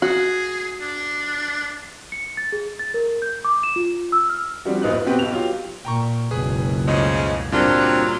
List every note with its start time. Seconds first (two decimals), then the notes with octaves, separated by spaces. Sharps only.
0.02 F#4 G#4
0.81 D4
2.12 C#7
2.37 A6
2.52 G#4
2.79 A6
2.94 A#4
3.22 G6
3.45 D6
3.63 E7
3.76 F4
4.12 E6
4.30 F6
4.65 F3 G3 C4 D4 F#4
4.82 F1 A#1 D#4 F#6
4.93 B4
5.06 B2 B3 C4 G4 B4
5.19 B1 G4 F7
5.32 F#3 F4 G4
5.85 A#2 G5 A#5 C#6
6.31 F#1 C#2 B2 G#4 B4
6.87 B1 C#3 F3 G#3 A3 D#5
7.52 G2 A#2 F#3 G3 A#3 C4 D4 F4